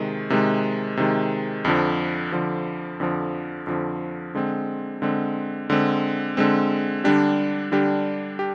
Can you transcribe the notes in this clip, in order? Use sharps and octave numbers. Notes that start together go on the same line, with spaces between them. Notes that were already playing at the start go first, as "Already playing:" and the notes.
Already playing: C3 D#3 G#3
C3 D#3 G#3
C3 D#3 G#3
F2 D3 F3
F2 D3 F3
F2 D3 F3
F2 D3 F3
D3 G#3 C4
D3 G#3 C4
D3 G#3 C4
D3 G#3 C4
D3 G3 D4 G4
D3 G3 D4 G4
G4